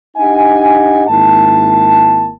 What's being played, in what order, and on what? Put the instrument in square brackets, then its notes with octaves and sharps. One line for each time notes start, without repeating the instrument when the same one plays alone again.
[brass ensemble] D4 D#4 G4 D#5 F#5 G#5
G#1 G#2 A#3 E4 A5